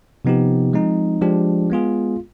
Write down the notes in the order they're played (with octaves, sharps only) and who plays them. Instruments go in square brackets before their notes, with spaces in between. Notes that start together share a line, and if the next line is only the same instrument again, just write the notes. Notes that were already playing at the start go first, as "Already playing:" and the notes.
[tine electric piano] C3 F3 B3 D#4 G4
F3 G#3 C4 D#4
F3 G#3 D4 G4
G#3 B3 F4 G#4